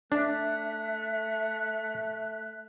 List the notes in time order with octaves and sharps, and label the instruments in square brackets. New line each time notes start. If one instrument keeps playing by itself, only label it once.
[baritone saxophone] A3 [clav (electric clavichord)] D4 [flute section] E5 F#6